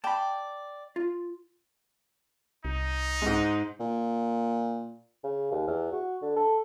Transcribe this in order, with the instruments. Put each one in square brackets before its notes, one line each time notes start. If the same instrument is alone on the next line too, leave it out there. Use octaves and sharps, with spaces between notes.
[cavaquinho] D5 G5 [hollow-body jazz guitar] A5 B5
[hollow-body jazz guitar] F4
[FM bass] C2 [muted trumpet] D#4
[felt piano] G#2 G#3
[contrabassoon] A#2
[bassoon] C#3
D#2
E2
F#4
D3
A4